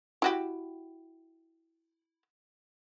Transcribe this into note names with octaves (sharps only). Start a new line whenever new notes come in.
E4 F#4 G4